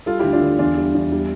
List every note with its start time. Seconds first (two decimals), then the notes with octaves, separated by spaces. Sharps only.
0.06 G3 F4 A4
0.19 D2 E4 G4
0.32 D4 F4
0.41 D3
0.58 E2 D4 F4
0.77 G3
0.95 E2
1.12 G3